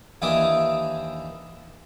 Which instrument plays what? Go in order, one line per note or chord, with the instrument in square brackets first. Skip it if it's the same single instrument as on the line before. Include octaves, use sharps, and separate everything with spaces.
[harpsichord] D#2 E3 D4 E5 D6 D#6